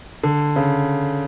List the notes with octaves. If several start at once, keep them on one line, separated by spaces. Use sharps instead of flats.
D3
C#3